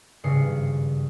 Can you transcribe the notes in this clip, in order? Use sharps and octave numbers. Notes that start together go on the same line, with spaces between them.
G#1 G2 C#3 D#6 C7 C#7